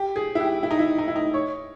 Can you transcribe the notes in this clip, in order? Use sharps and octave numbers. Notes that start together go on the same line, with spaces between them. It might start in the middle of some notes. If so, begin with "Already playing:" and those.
Already playing: G4
G#4
E4
G4
E4
D#4
E4
D#4
E4
D#4
C#5